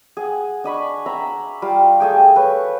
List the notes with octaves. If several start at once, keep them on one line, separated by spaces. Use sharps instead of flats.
G#4 F#5
D4 D#5 B5 C#6
E5 A#5 B5
G3 F4 F5
A3 G#4 G5
A4 B4 C#5